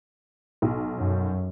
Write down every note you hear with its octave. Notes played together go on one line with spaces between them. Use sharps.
B1
F#2